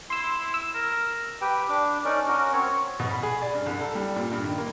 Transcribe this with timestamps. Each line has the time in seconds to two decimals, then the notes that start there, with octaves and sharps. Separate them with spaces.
0.10 E4 C6 E6
0.54 E6
0.75 A#4
1.41 G4 B4 G5
1.69 D4 D6
2.05 C#4 D#4 A#4 D5
2.28 C#4 F#4 A#4
2.53 C4 C#5
3.00 B2
3.11 B5
3.23 G#4
3.42 D5
3.54 G2
3.66 C2
3.80 A4
3.95 G3
4.16 A#2
4.32 G2
4.44 D#3
4.58 A#3